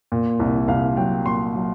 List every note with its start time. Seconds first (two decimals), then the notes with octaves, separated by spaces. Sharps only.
0.12 A#2
0.39 C2
0.68 C2 F5
0.97 F#3 G5
1.25 A#2 C6
1.55 F#3